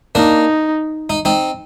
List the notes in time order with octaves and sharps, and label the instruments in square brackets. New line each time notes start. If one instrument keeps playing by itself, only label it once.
[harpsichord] A#3 D4 [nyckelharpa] D#4
[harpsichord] D#4
C4 D#4